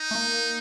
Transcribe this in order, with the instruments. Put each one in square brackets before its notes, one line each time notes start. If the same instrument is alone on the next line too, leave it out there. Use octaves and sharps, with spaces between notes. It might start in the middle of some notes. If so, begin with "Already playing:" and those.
Already playing: [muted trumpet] D#4
[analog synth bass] A3
A#3